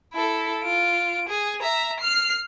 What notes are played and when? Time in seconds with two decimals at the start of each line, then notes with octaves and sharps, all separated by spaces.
0.13 E4 A4
0.63 F4 D7
1.29 G#4
1.62 E5 A#5
2.00 F6 C7